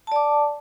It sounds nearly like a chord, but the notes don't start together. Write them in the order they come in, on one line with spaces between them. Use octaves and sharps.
A5 D5 D6